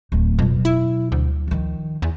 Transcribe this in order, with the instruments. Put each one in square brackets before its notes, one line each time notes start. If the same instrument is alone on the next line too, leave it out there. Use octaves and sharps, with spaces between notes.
[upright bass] D1 A3
[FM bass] F2 [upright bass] B2 F#3
[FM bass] E4
D2
[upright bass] D#3 F3
[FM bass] E2